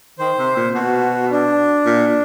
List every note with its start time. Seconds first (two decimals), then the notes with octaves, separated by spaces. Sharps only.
0.19 D#3 C5
0.38 C3
0.56 A#2
0.75 B2 F#4
1.31 D4
1.86 A#2